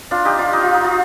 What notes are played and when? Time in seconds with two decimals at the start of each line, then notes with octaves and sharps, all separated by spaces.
0.11 D4 F4
0.25 D#4 G4
0.39 D4 F4
0.53 D#4
0.63 F4
0.74 D#4
0.85 F4